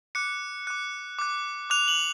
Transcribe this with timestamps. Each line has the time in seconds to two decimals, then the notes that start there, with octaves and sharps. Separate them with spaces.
0.15 D6 F#6 C#7
0.67 D6 F#6
1.19 D6 F#6
1.70 D6 F#6 F7
1.88 F#7